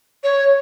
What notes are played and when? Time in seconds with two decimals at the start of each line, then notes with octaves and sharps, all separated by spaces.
0.24 C#5